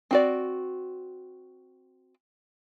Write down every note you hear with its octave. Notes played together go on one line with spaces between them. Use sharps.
C4 F#4 D5